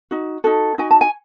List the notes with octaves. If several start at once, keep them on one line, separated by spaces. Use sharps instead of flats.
D#4 F#4
D#4 F#4 A4
D#4 F#4 G#5
A5
G#5